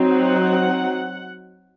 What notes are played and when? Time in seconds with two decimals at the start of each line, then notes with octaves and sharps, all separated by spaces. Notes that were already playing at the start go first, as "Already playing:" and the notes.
Already playing: F#3 C4 D#4
0.11 F#5